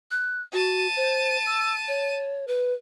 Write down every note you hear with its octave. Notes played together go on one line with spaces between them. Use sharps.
F#6
F#4 A5 D#7
C5
E6
C#5
B4